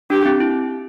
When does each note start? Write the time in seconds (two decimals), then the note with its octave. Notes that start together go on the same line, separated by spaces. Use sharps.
0.10 D4 G4
0.25 C4
0.40 E4